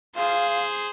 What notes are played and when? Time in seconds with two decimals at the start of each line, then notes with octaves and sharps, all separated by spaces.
0.16 G#4 C5 F5